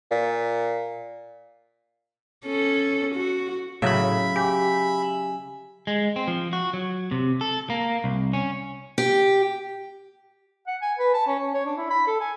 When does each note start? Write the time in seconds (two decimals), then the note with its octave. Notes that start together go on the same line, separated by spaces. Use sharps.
0.11 A#2
2.46 C#4 A4
3.15 F#4
3.82 A2 C#3 F#3 E5 B5
4.36 G4 G#5
5.87 G#3
6.16 C4
6.28 F3
6.53 F#4
6.74 F#3
7.11 C3
7.41 A4
7.70 A#3
8.04 C2
8.33 C#4
8.98 G4
10.67 F#5
10.82 G#5
10.98 B4
11.14 A5
11.27 C#4
11.39 C#4
11.54 C#5
11.66 D4
11.78 E4
11.90 B5
12.07 A4
12.21 G#5